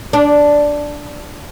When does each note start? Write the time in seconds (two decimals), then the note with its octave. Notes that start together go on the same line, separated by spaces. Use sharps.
0.13 D4